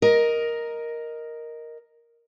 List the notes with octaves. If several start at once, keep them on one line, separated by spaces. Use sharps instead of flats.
A#4 D#5